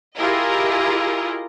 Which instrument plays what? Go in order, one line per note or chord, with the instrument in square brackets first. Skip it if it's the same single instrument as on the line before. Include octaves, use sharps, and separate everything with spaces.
[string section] E4 F4 G4 G#4 A#4 D#5